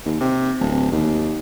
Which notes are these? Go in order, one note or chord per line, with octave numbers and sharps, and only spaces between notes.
D#2
C3
D1
D#2